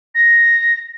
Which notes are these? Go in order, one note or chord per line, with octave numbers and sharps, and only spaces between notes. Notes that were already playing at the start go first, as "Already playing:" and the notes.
A#6